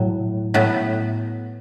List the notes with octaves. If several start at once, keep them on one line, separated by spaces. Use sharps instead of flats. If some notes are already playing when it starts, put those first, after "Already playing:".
Already playing: A2 F#3
A2 F#3 B3